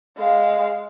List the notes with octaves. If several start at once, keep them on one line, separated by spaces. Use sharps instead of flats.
G#3 F5